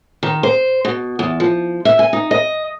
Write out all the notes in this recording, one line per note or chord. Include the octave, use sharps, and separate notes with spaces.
D#3
C5
B2
E2
F3
E5
G#5
D#4
D#5